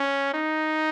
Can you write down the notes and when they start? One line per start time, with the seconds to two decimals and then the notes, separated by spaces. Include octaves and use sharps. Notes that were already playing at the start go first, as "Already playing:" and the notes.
Already playing: C#4
0.34 D#4